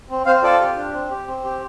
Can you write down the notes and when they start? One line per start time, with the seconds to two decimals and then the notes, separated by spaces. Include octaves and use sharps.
0.10 C4
0.26 C4 C5 F5
0.43 F4 A4 D5
0.61 G4
0.76 D4
0.93 C4
1.11 G4
1.27 C4
1.44 G4